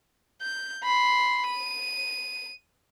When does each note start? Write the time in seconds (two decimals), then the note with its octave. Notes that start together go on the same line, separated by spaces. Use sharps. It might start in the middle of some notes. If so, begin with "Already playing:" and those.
0.41 G6
0.84 B5 C6
1.46 D#7